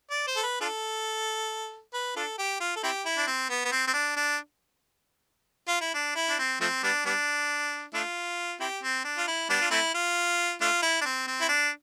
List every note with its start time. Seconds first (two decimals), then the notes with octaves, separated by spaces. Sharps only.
0.11 D5
0.27 C5
0.36 A4
0.43 B4
0.61 D4 F4 A4
1.94 B4
2.16 D4 F4 A4
2.38 G4
2.61 F4
2.76 A4
2.83 C4 E4 G4
3.06 E4
3.17 D4
3.27 C4
3.50 B3
3.65 B3
3.72 C4
3.87 C4
3.93 D4
4.16 D4
5.68 F4
5.81 E4
5.94 D4
6.15 E4
6.29 D4
6.39 C4
6.61 F3 A3 C4
6.83 G3 B3 D4
7.06 G3 B3 D4
7.94 A3 D4 F4
8.60 C4 E4 G4
8.83 C4
9.04 D4
9.18 F4
9.27 E4
9.50 G3 B3 D4
9.61 F4
9.71 A3 C4 E4
9.94 F4
10.61 A3 D4 F4
10.82 E4
11.01 D4
11.05 C4
11.27 C4
11.41 E4
11.49 D4